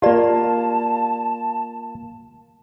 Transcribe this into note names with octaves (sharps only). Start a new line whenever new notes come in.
A#3 F4 G4 D5 A5